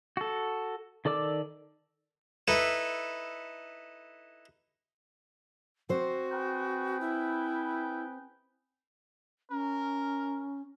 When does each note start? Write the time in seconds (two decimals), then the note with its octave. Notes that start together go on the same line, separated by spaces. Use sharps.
0.17 F#4 A4
1.05 D#3 A4 D5 D6 E6
2.48 D#4 E4 A4 B4
5.89 C4 F#4 C5
6.31 G#4 B4 G5
7.00 E4
9.51 C#4 A#4